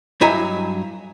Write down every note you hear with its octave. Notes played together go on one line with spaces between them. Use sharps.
G2 F#3 E4 D#5 G#5 A#5